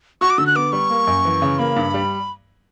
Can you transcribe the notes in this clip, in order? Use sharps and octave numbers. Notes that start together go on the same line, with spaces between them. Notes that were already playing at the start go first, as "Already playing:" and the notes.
F#4 C#6
D6
D3 E6
F#6
B3 D6
G3 C#6
A#3
F#2
E3
C#3
A#3 B5
G2
G3